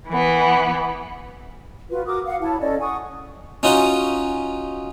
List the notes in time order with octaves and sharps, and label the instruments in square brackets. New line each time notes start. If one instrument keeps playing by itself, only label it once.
[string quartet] E3 B3
[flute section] F4 F#4 B4
F#4 A#4 D6 D#6
F5 F#5
E4 C#5 A5 B5
C#4 A4 D5 D#5
F#5 G#5 C#6 D#6
[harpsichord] C#4 D#4 F4 F#4 A#5